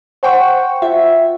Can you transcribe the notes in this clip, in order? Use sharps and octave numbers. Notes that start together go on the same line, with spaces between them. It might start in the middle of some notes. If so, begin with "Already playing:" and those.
C5 F#5 G5 C#6
F4 E5